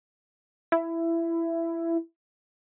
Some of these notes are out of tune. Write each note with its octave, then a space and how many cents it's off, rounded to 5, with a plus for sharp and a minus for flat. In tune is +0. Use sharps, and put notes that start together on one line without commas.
E4 +15